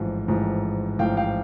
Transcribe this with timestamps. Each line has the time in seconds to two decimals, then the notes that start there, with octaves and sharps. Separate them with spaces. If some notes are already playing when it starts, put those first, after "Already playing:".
Already playing: A1 G#2 F3
0.28 A1 G#2 F3
0.99 A1 G#2 F3 F5 G5
1.17 F5 G5